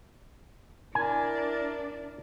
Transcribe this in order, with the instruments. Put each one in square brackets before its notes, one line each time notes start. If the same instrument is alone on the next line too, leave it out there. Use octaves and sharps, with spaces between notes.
[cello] D4 [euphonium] E4 [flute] A#4 [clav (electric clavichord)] G#5